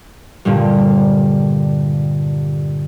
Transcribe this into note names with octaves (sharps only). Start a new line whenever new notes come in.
G2 A#2 D3 G3